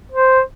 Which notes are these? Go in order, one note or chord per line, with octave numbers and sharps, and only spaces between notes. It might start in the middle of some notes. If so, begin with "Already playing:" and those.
C5